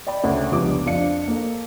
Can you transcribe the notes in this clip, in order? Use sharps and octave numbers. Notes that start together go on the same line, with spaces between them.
D5 G5 B5
D2 C#3 C#5 E5
F1 C#2 G3 B3 D4 D6
F2 D4 F5 C#7
A#3 A4